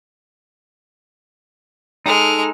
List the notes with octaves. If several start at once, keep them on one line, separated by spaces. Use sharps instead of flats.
G#3 D#4 A4 F6